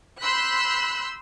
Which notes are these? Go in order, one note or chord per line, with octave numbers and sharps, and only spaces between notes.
B5 C6 E6 F#6 G6 B6